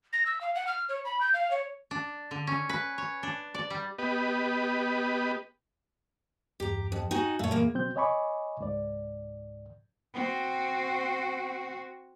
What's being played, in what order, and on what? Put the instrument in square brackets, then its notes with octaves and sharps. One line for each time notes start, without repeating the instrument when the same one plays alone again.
[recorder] A#6
E6
F5
F#5
F6
C#5
B5
G6
F5
C#5
[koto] D4
D3
C#4
B4
C#5
D4
D5
G3
[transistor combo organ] B3 G4 B4 D#5
[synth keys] E2 G2 [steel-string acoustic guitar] G4 A#5
[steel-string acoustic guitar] F2
[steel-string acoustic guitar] D#4 F#4 G#5 [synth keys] G5
[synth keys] F#2 A#2 F5 [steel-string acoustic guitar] A3 C#5
[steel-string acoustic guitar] E2 A#3
[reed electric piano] B2 F#3 C4 G6
C#5 D#5 G#5 B5 C#6 D6
C#2 G#2 D5
[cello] C4 F#4